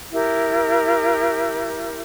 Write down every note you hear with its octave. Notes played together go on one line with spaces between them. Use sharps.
E4 G4 A#4